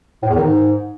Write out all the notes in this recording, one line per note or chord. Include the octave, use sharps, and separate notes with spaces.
A2
E2
D#3
G#2